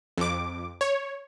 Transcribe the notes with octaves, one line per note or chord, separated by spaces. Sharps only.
F2 D6
C#5